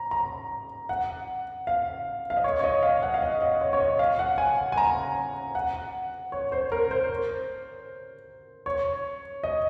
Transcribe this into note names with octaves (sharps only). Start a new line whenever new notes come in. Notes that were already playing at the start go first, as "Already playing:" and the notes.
Already playing: A#5
A#5
F#5
F5
F5
D#5
C#5
C#5
D#5
F5
F#5
F5
D#5
D#5
C#5
C#5
D#5
F5
F#5
G#5
G#5
A#5
F#5
C#5
C5
A#4
C5
C#5
D#5